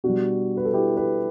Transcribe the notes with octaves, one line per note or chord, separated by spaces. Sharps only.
B2 G3 D4 F#4
B4
A4
E4 G4
G4 B4